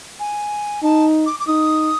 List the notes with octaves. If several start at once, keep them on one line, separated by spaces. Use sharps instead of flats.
G#5
D#4 A5
D6
D6
D#4 D#6